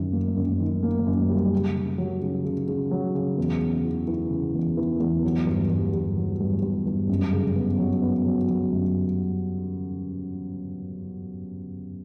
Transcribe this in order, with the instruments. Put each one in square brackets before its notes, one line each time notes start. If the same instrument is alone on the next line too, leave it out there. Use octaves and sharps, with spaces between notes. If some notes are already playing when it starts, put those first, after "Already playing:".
Already playing: [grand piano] F#2 D#3
A#3
F#2
D#3
A#3
F#2
G3
C#3
C#3
F#3
C#3
C#3
C#3
F#3
C#3
E2
C#3
E3
E3
C#3
E2
E3
E2
F#3
G2
G2
G2
F#3
G2
G2
G2
F#2
C#3
B3
F#3
B3
F#3
F#3
F#2